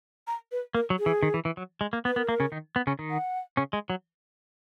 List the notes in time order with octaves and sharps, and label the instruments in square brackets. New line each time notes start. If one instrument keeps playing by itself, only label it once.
[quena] A#5
B4
[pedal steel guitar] A#3 [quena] A#4
[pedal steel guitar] F#3
[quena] G#4
[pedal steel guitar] E3
D#3
E3
E3
F#3
G#3
A#3
[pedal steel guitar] B3 [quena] B4
[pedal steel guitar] B3 [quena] A#4
[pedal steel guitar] A#3
C#3 C#4
D#3 D#4
B3
C#3 C#4
D#3 D#4
[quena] F#5
[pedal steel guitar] C#3 C#4
G#3
F#3